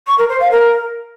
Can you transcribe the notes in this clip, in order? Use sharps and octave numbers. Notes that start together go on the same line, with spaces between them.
C#6
A#4
C5
F5
A#4